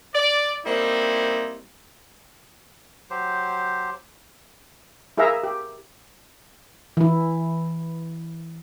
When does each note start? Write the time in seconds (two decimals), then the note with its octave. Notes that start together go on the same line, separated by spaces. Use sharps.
0.14 D5
0.66 G3 A#3 C4 D#4 E4
3.10 F#3 G4 C5
5.17 E4 G#4 A#4 E5 F5 A#5
5.43 G4
6.97 E3 E4